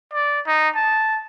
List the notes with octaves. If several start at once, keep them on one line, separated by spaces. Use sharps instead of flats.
D5
D#4
A5